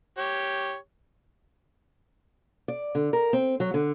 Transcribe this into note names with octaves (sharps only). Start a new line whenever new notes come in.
G4 C#5
D5
D3
A#4
C4
F#3
D3